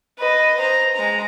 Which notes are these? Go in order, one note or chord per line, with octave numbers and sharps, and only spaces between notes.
B4 D#5
C5 A#5
G#3 A#5